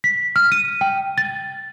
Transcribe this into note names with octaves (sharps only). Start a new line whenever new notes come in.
B6
F6
D#7
G5
A6